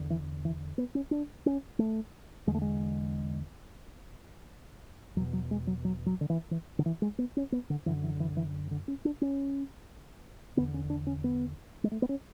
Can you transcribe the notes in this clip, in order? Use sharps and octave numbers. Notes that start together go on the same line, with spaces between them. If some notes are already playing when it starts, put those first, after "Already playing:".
Already playing: E2 D3
E3
E3
B3
C#4
D4
C#4
A3
E2 D3 G#3
A3
G#3
E2 B2 F#3
F#3
G#3
F#3
F#3
F#3
D3
E3
E3
D3
E3
G#3
B3
C#4
B3
D3
F#2 D3 E3
E3
E3
E3
D3
C#4
D4
C#4
E2 D3 B3
C#4
D4
C#4
B3
G#3
A3
B3
C#4